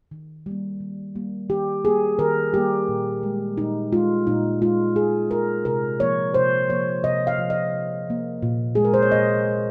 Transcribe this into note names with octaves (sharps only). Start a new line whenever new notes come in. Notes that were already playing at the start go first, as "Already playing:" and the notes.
D#3
G3 A#3
D#3
G3 A#3
D#3 G4
G3 A#3 G#4
D#3 A#4
G3 A#3 G4
A#2
G#3
A#2 D#4
G#3 F4
A#2 D#4
G#3 F4
A#2 G#4
G#3 A#4
C3 A#4
F3 A#3 C#5
C3 C5
F3 A#3 C#5
C3 D#5
F5
F3 A#3
D#5
C3
F3 A#3
A#2
G#3 G#4
A#4
C5
C#5
A#2 D#5
G#3